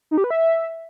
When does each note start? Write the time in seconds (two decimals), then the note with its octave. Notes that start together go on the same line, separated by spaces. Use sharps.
0.11 D#4
0.18 G4
0.24 B4
0.31 E5